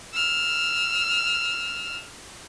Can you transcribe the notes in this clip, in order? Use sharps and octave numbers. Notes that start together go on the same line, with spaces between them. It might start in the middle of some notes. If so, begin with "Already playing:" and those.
E6 F6